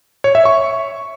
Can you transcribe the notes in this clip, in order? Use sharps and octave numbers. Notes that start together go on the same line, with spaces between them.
C#5
E5
C#6